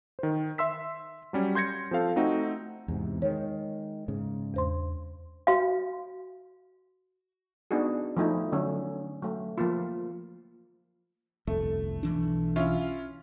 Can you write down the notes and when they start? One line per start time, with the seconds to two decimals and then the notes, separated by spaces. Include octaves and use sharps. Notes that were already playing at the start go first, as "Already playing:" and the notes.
0.19 D#3 C5
0.58 E5 C6 E6 B6
1.33 F#3 G3 C#4
1.55 C6 G6 G#6 A#6 C#7
1.91 F3 C4 A4 F5
2.16 A3 C4 D#4 F#4
2.88 E2 G#2 C3
3.22 D#3 G#3 C#5
4.08 G#2 C#3
4.54 E2 C5 C6
5.47 F#4 F5
7.71 B3 D4 D#4 F#4 G#4
8.17 F3 A3 D#4 E4
8.52 D3 F#3 C#4
9.22 F#3 A3
9.58 F3 A#3 F4
11.47 G1 C2 F2 A3
12.03 B1 E3 D4
12.56 C#4 E4 F4